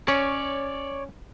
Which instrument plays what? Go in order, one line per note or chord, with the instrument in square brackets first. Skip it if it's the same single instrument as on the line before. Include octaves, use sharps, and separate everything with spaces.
[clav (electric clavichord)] C#4 [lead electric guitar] C#5 D5